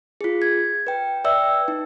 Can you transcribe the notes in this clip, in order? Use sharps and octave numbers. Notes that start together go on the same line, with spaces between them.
F4 G#4
G#6
B4 G5
B4 D5 E5 G5 E6
D#4